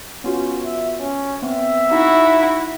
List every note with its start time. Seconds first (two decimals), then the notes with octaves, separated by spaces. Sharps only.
0.24 B3 C#4 F4 F#4
0.64 E5
1.00 C#4
1.42 B3 C4 E5
1.92 D#4 E4 F#4